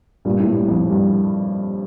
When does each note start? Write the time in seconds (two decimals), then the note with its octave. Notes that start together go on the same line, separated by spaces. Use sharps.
0.25 G2 A#2
0.40 A2
0.47 G2
0.68 F2
0.90 G2